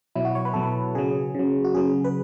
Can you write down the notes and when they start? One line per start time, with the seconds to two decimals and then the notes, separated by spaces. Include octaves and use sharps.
0.15 B2 F#3 E4
0.25 F#4
0.35 C#5
0.45 B4
0.54 B2 F#3 A4
0.62 B4
0.95 C#3 F#3 G#4
1.35 C#3 F#3
1.65 F#4
1.74 C#3 F#3 G#4
2.04 B4